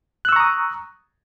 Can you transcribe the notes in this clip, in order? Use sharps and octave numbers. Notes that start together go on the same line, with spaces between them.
A#5 C#6 D#6 E6 F#6